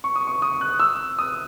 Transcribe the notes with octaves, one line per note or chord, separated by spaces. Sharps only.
C#6
D#6
C#6
D#6
F#6
E6
D#6